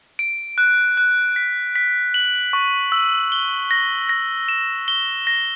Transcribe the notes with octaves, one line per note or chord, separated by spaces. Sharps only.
D7
F#6
F#6
B6
B6
F#7
C#6
E6
G7
A#6
A#6
E7
G7
A#6